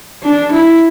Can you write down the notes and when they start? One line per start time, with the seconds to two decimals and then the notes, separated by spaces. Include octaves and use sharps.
0.23 D4
0.52 E4